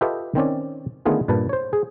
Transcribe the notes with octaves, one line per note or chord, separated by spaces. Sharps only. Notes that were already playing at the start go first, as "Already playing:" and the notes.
F4 G4 A4 B4 D#5 E5
D#3 C4 C#4 D5
D3 D#3 A3 B3 F4 G#4
G2 A#2 B4 A5
C5 C#5
G#4